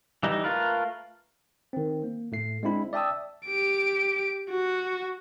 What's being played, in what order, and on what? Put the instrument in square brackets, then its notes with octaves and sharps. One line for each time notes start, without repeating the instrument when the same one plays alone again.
[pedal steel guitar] E3 G3 D#4
A3 F4 A#4 B4
[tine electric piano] D#3 C4
A#3
A2 A3 C7
G#3 C4 D4 E4 B5
D5 E5 G5 A5 D#6 E6
[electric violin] G4 D7
F#4